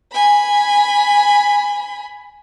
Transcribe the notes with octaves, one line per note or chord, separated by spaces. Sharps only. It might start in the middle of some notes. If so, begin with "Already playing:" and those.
G#5 B5